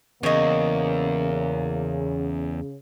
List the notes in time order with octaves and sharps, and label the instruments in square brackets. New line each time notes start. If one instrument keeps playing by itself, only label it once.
[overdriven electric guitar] E2 [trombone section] C#3 [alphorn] A#3 [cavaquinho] C#5 D#5